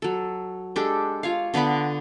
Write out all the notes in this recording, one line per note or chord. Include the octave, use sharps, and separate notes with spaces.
F#3 A4
G#3 D4 G4 A4
F4 C#5 F5
D3 B3 D5 B5